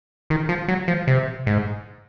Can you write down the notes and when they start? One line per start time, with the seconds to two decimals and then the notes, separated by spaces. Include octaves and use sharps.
0.30 D#3
0.49 F3
0.68 F#3
0.88 F3
1.07 C3
1.47 G#2